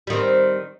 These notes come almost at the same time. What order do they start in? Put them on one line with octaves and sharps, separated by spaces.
G3 D#3 C4